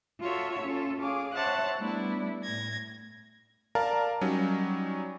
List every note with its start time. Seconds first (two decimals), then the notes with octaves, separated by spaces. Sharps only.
0.21 F4 F#4 A4 C#5 E5
0.64 C#4 F4 A4
1.00 G#4 C#5 F5 D6
1.35 C5 C#5 E5 F#5 A5 F#6
1.77 G3 A3 B3 D4 E4
2.43 A2 G#6 A#6
3.75 A#4 D5 F5 A5 A#5
4.21 F#3 G3 C#4 D#4